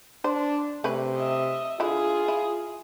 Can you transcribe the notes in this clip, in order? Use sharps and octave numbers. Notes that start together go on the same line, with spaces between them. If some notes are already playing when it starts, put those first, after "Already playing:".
D4 C5
C3 A3 C#4 B4
D#5 E5
D3 E4 F4 G#4
E4